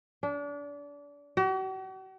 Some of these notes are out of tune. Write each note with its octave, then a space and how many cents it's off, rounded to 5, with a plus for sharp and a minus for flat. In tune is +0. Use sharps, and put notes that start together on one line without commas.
D4 -30
F#4 +45